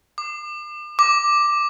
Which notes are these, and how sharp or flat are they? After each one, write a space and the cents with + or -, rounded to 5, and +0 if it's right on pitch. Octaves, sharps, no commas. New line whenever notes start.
D6 +40
D6 +5